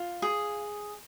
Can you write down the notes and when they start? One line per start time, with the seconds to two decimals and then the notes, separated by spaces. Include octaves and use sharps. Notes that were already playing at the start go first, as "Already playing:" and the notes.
Already playing: F4
0.22 G#4